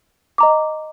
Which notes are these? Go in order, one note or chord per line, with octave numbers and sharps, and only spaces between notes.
D#5 A#5 D6